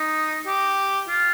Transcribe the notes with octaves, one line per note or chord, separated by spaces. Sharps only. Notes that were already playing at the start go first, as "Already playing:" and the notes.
Already playing: D#4
G4
F4